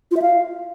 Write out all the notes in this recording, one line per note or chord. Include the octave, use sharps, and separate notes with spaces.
F4
E5
F5